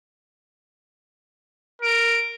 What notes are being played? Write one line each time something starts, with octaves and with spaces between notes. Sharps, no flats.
A#4 D7